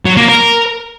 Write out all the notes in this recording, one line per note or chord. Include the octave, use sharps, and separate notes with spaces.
F#3
A#3
A#4